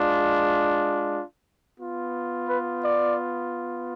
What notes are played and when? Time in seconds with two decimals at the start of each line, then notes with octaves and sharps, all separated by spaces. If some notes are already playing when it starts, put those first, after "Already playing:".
Already playing: G#3 D4 F4
1.78 B3 F4
2.48 B4
2.84 D5